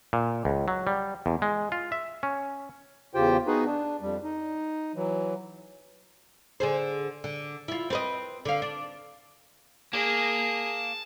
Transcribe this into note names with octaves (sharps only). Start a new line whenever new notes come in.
A#2
C#2
F#3
G3
E2
G#3
F4
E5
C#4
E2 C#3 F4 G4 C5 G5
B3 D#4 F#4 G#4 B4
D4
F2 G3
D#4
E3 F#3
D3 G#4 C5
D3
E4 F4
C4 B4 D#5
D3 F5
D4
A#3 G#4 A5